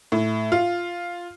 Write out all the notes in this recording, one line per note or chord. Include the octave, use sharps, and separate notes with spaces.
A2
F4